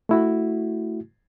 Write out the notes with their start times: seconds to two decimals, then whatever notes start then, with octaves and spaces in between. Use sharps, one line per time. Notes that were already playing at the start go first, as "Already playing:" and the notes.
0.09 A3 E4 F#4